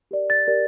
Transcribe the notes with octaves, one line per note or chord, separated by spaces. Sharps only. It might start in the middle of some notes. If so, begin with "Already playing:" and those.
G4 A#4 D5
A6
G4 A#4 D5